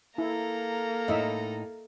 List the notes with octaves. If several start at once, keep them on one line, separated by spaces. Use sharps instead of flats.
A#3 E4 A4 A#5
A2 D#4 D#5 E5